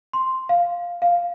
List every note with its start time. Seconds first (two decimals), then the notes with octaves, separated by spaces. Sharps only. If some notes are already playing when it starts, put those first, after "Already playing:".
0.13 C6
0.49 F5
1.02 F5